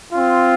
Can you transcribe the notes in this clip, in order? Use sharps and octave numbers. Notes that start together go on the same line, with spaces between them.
C4 F4